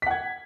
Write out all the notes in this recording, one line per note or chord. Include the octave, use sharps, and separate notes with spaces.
F#5 G#6 B6